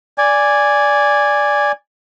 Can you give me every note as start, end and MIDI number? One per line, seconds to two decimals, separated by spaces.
0.18 1.72 74
0.18 1.72 80